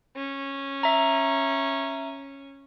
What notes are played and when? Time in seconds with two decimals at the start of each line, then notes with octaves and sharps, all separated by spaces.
0.16 C#4
0.83 E5 A#5